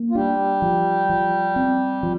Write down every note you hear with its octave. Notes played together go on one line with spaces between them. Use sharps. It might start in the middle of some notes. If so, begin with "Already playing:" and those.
Already playing: A#3
F4
G3 D4 G4
F3
F3
C4
F3